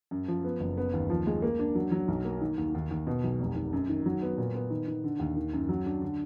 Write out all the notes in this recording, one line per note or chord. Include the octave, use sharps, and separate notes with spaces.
F#2
F3
B3
F#1
B3
D#2
F3
G#3
A#3
D4
F#3
F#3
B1
A#3
D#3
D#2
D#2
D#2
B2
B1
F1
D#3
F#2
D#3
F#3
B3
A#2
B3
D#3
D#3
D3
D#2
D#3
F#2
F#3
D4
D3